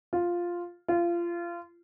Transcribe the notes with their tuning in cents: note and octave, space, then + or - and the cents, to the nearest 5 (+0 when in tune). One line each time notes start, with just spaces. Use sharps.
F4 +0
F4 -25